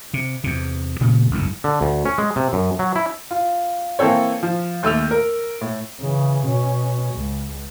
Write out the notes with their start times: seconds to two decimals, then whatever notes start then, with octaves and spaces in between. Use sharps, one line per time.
0.14 C3
0.44 E2 C3
1.00 A#2 C#3 E3 A3
1.31 F#1 C2 G#2 D3
1.64 D3
1.81 D2
2.05 C#4
2.18 G#3
2.36 C3
2.53 F#2
2.79 F#3
2.96 E4
3.31 F4
3.99 E3 A#3 C4 A4 C#5
4.43 F3
4.83 D#2 A3 E6 F7
5.11 A#4
5.61 A2
6.01 C#3 E3
6.47 B2 C#4
7.15 C#2